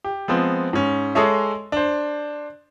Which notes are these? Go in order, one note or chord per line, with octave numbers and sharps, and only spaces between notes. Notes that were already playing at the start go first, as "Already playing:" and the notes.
G4
F3 G#3 B3 C4
G#2 C#4
G#3 G#4 A4 C#5 D#5 E5
D4 C5